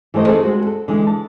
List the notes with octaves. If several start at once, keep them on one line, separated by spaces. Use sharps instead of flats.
E3 G3 A3 C5 D#5
C4 G#4 A4 C5
G3 G#3 F#4
A4
D3 E3 G#3
A5